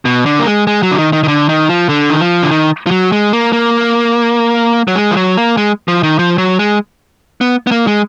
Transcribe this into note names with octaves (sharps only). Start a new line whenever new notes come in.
B2
D3
A#3
G#3
G#3
F#3
D3
D#3
D#3
D#3
D3
D#3
F3
D3
D#3
F3
D3
D#3
F3
F#3
G#3
A#3
A#3
F#3
G#3
F3
F#3
A#3
G#3
F3
D#3
F3
F#3
G#3
B3
B3
A#3
G#3